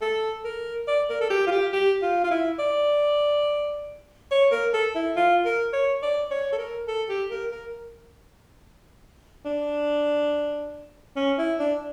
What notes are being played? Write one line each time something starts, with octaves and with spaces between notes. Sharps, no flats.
A4
A#4
D5
A#4
A4
G4
F4
G4
G4
F4
F4
E4
D5
C#5
A#4
A4
E4
F4
A#4
C#5
D5
C#5
A4
A#4
A4
G4
A#4
A#4
D4
C#4
E4
D4